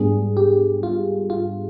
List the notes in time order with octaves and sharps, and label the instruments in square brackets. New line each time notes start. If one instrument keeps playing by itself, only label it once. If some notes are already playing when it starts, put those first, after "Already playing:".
Already playing: [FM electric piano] G#2 G3 B3 D4 G#4
G4
F4
F4